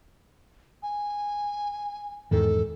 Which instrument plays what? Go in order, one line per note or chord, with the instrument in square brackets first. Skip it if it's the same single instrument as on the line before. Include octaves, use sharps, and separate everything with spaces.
[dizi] G#5
[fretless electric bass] E2 G#2 D#3 [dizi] A4